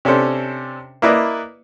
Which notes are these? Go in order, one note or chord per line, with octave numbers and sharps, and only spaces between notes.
C3 C#4 D4 A4 C5
A#3 E4 B4 D5 D#5